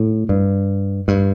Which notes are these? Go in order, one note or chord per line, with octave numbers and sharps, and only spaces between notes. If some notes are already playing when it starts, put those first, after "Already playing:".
Already playing: A2
G2
G2